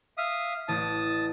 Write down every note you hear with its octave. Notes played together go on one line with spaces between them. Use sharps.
E5 F5 D#6
A1 A5 D#6